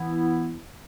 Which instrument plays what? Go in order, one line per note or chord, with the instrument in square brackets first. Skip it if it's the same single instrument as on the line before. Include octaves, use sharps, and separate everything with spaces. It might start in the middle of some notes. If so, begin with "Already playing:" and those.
Already playing: [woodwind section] E3 B3 E4